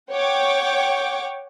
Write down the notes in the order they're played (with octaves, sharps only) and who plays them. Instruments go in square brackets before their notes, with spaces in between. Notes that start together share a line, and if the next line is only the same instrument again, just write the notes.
[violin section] C#5 F#5 G5 C#6 D6